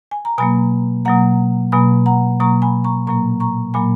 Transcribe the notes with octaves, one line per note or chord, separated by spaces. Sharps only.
G#5
A#5
B2 F#3 A#3 G#5 B5
B2 F#3 A#3 F#5 A#5
B2 F#3 A#3 G#5 B5
F#5 A#5
B2 F#3 A#3 A#5 C#6
G#5 B5
A#5 C#6
A#2 F#3 A#3 A#5 C#6
A#5 C#6
A#2 F#3 A#3 G#5 B5